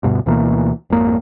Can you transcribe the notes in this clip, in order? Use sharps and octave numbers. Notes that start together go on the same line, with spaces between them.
D2 G2 B2
D2 B2 E3 A#3
G#1 F2 A#3